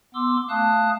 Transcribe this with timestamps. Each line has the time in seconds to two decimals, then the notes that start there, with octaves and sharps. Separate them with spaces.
0.14 B3 C6 D6 E6
0.49 A3 F5 A5 D#6 F#6